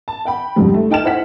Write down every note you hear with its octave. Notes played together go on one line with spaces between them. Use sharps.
A5
F#5 G5 B5
C2 F2 G#2 C#3 F3 G3
A3
D#4 G5 A5 F6 E7
E4 C5 F#5 B6